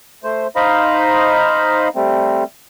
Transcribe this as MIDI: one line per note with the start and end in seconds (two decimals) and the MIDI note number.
0.24 0.47 57
0.24 0.47 72
0.56 1.88 63
0.56 1.88 72
0.56 1.88 75
0.56 1.88 77
0.56 1.88 82
0.56 1.88 83
1.95 2.44 55
1.95 2.44 57
1.95 2.44 60